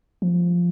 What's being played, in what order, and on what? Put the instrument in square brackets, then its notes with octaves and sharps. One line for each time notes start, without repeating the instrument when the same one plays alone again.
[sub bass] F3